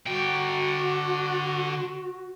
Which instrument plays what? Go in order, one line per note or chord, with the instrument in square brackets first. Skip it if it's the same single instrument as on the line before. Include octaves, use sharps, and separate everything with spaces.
[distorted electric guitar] D3 G5 [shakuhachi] F#4